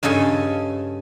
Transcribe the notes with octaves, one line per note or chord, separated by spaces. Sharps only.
G2 C#3 A4 D#5 G#5